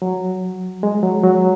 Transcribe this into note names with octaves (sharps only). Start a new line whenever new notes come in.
F#3
G#3
F#3
F#3